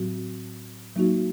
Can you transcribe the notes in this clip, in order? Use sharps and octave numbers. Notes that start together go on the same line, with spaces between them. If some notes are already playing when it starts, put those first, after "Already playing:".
Already playing: A2 F#3 C4 F#4
F#3 A#3 D#4 F#4